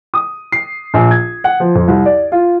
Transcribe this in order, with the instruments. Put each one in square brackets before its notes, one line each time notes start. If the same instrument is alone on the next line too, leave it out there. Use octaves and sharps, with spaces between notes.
[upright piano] D#6
C7
A#1
G#6
F#5
F3
F2
C2
D5
F4